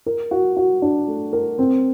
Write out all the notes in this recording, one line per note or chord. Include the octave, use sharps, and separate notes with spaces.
A#4
F#4
F#4
D4
A3
A#4
C4